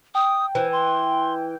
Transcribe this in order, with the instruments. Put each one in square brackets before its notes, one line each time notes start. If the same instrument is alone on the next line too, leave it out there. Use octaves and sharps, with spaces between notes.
[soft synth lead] G5 [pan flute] D#6
[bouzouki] E3 [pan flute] C5
[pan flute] C6